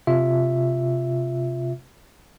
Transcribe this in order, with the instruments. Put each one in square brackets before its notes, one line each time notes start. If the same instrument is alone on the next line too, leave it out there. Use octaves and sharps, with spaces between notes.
[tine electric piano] C3 F4 E5